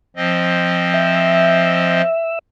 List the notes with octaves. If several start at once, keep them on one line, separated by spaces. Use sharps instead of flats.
F3 C4 D#5
E5